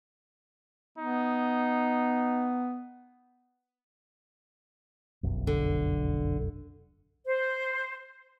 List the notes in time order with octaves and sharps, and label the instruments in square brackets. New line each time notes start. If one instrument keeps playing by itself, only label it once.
[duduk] B3 [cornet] D#4
[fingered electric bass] F1 B1 F#2
[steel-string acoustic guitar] D3
[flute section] C5